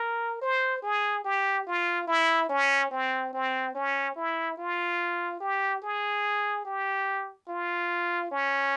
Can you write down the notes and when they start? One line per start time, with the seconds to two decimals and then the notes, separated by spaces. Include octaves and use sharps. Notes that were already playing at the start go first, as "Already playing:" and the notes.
Already playing: A#4
0.42 C5
0.83 G#4
1.25 G4
1.66 F4
2.08 E4
2.49 C#4
2.91 C4
3.33 C4
3.75 C#4
4.16 E4
4.58 F4
5.40 G4
5.82 G#4
6.65 G4
7.48 F4
8.31 C#4